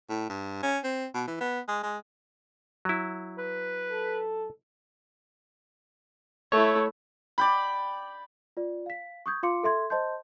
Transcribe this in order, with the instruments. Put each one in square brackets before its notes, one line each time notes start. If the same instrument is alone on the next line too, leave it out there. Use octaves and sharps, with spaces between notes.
[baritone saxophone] A2
G2
C#4
C4
B2
E3
B3
G#3
G#3
[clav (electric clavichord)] F#3 E4
[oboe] B4
[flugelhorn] A4
[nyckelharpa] A3 E4 [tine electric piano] C#5
[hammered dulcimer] D5 G5 B5
[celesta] F4 D5
F5 B6
C#6 D#6 G6 G#6
F4 F5 C6 D6 C#7
A4 E5 C6 G#6
C5 D#5 A5 C6 G6